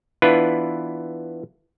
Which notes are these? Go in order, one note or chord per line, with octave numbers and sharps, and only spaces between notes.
E3 B3 D4 E4 F4 B4